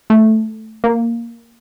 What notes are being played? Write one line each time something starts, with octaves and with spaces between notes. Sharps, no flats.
A3
A#3